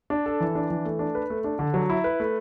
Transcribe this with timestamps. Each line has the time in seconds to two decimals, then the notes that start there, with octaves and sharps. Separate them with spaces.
0.10 D4
0.26 A4
0.40 E3
0.55 D4
0.70 E3
0.85 A3
0.99 D4
1.15 B4
1.30 A3
1.44 D4
1.59 D3
1.74 F#3
1.90 E4
2.04 B4
2.20 A3